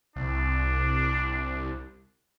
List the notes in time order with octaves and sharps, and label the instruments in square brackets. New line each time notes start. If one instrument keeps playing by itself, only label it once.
[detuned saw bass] C2 [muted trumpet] D4